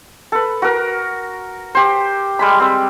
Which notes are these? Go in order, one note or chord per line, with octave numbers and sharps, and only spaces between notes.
A4 B4
F#4 A#4
G4 C5
G3 G#3 B5
C4 E6